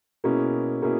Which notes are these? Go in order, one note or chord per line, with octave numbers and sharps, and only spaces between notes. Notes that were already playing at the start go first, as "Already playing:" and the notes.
B2 A#3 C#4 E4 G#4
B2 A#3 C#4 E4 G#4